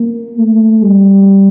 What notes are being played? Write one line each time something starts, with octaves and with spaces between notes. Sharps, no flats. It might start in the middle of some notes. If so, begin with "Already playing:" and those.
Already playing: A#3
A3
G3